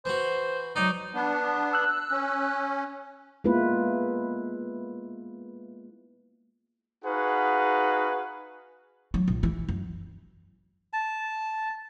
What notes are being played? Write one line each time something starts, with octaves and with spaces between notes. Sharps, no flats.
E3 F#4 C5
F#3 D#4 D5
B3 D4
E6 F#6
C#4
G#3 A#3 B3 E4 F4 B4
D#4 F#4 G#4 B4 F5 F#5
F#3
A#1
E3
F#2
A5